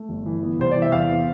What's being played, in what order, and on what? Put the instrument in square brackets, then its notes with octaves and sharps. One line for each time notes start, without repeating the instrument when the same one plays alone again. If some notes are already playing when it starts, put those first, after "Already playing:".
Already playing: [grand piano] A3
G1
E3
B3
C2 C5
E3 D5
E5
E2 F5
B3